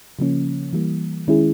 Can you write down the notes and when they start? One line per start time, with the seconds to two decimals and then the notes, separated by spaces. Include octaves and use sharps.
0.19 C#3 F3 A#3 C#4
0.73 E3 G3 A#3
1.28 D#3 G#3 C#4 E4 G#4